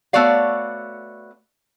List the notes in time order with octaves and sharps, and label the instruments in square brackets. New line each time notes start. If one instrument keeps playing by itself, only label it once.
[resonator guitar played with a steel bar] A3 B3 F#4 C#5 D5 F5